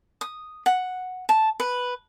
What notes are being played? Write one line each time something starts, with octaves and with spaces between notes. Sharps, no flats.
D#6
F#5
A5
B4